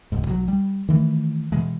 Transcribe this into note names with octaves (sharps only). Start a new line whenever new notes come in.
E1 C#2 G#2
B1 F#3
G3
D#3 E3 A3
B2 E3 G#3